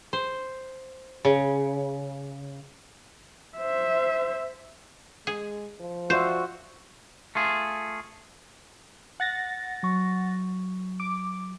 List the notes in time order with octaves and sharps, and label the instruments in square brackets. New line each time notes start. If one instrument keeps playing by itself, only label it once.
[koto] C5
C#3
[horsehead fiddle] C5 E5
[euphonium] G#3 [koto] G#4
[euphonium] F3
[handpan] F4 D5 E5 [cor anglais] F#4 [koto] C5
[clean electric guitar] A3 F4 G#4
[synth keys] F#5 A6 A#6
[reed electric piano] F#3 C#6
[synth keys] D6